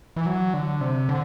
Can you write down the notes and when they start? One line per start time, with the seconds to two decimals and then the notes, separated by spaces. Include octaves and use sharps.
0.16 E3
0.26 F#3
0.54 D3
0.81 C3
1.09 D3